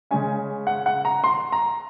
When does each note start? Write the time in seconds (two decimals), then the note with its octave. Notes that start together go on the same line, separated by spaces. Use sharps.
0.11 C#3 G#3 C#4 G#5
0.67 F#5
0.86 F#5
1.05 A#5
1.24 C6
1.52 A#5